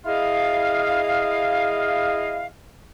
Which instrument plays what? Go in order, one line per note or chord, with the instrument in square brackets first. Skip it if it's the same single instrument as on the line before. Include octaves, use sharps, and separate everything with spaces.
[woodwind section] E4 G#4 D#5 F5